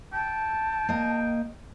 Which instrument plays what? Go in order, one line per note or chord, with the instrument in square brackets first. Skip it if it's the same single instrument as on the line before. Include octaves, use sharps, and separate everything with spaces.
[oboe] G5 [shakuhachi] A5
[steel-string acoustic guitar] A#3 D#5